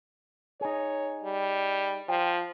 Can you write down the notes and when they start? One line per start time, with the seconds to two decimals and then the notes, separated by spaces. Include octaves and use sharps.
0.61 D#4 G#4 C#5
1.24 G3
2.08 F3 G5